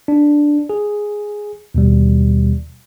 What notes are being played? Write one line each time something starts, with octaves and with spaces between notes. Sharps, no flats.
D4
G#4
D#2 B2 G3